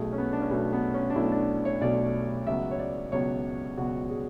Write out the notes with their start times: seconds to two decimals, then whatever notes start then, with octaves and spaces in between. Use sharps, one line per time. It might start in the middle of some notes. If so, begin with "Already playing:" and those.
Already playing: B1 B2 A3 G#4
0.13 C#4
0.18 B3
0.32 D4
0.42 C#4
0.51 B1 B2 A3 B3
0.73 B3
0.94 C#4
1.10 D4
1.16 B1 B2 A3 E4
1.32 D4
1.65 C#5
1.81 B1 B2 A3 D5
2.47 C#2 B2 F#3 B3 E5
2.71 C#5
2.79 D5
3.12 C#2 B2 F#3 B3 C#5
3.77 C#2 B2 F#3 B3 F#4
4.10 G#4